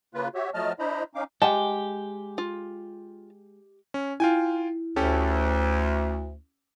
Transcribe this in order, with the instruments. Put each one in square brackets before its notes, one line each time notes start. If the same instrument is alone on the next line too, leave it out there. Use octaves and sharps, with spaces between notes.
[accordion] C#3 A#3 F4 B4
F#4 G4 C#5 E5
F3 F#3 A3 D#5 A5 F6
D4 E4 C5 D#5 A#5 B5
C#4 D#4 F5 D6
[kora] G#3 [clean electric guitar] G4 [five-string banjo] F#5 A5
[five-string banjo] F4
[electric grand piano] C#4
[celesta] E4 [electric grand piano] F4 G5 G#5
[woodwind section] D2 [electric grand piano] C#4 G4 A4